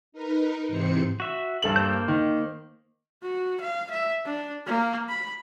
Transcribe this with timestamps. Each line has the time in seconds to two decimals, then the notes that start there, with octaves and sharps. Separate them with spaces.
0.12 D#4 A#4 B4
0.68 G#2 C3 E3 C4 C5 C#7
1.20 F#4 E5
1.62 G2 A4 F#7
1.76 A#3 C5 G6
2.08 D#3
3.23 F#4
3.60 F5
3.90 E5
4.25 D4
4.66 A#3
5.09 B5